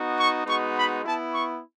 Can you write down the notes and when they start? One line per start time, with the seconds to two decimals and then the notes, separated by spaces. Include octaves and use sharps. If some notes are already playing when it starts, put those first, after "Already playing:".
Already playing: B3 D#4 F#4
0.17 C#6
0.46 G#3 B3 D#4 F#4 C#6
0.75 B5
1.04 B3 E4 A5
1.32 C#6